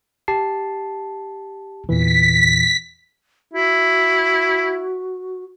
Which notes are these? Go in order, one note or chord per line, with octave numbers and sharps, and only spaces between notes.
G4 A5 C7
E2 A#2 E3 B6
E4 F#4